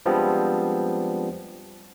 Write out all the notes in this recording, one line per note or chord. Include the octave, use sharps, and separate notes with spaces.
F3 G3 G#3 B3 C4 D4